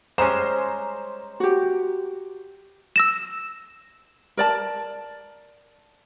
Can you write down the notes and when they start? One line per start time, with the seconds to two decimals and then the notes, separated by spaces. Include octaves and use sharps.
0.18 G3 G#3 C#4 C5 A#5 E7
1.40 F#4 G4
2.96 E6 A#6 E7
4.37 A#4 D5 A5